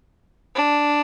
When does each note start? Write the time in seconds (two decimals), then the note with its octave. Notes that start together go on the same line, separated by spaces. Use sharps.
0.55 D4